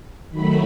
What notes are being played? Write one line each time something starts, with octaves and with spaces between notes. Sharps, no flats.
D#3 F#3 A3 B5